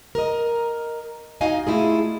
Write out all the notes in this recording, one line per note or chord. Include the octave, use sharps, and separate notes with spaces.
A#4 D#5
D#4 F#4 D#5 F5 G#5
A3 E4 F4 G#4